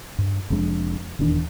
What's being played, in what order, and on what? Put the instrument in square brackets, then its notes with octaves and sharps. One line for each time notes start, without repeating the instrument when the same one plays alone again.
[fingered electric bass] G2
F1 F2 G#3 D4
D#1 E2 D#3 D4